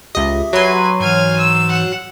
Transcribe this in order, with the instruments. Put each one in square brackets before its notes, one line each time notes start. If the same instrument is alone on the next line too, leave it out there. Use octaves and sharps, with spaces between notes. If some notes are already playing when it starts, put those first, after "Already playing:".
[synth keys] C#2 D#5 [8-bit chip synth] G4 E5
[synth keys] F#3 C6 [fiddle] B4 G#5
[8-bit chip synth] G#2 E3 [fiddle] G#5 F6
[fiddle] E6
F#5 E6